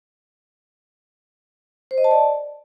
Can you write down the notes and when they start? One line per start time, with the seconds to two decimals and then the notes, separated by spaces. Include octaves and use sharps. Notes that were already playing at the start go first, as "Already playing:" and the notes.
1.91 C5
1.98 D#5
2.04 A5
2.11 D5